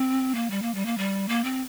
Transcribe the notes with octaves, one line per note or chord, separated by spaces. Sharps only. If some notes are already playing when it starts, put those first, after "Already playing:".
Already playing: C4
A#3
G3
A#3
G3
A#3
G3
A#3
C4